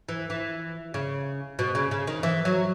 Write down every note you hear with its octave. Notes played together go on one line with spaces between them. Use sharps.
E3
E3
C#3
B2
C#3
C#3
D#3
E3
F#3